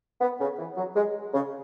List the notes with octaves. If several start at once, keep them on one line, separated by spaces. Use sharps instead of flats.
B3
C#3
E3
F#3
G#3
C#3